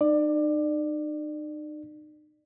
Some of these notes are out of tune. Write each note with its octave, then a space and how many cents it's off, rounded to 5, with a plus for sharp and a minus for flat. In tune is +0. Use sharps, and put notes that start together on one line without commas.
D#4 -40 D5 +20